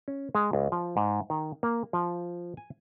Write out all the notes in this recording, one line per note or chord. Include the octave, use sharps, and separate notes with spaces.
C#4
G#3
C#2
F3
G#2
D#3
A#3
F3
G#5